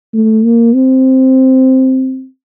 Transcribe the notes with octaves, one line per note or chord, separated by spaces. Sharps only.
A3
A#3
C4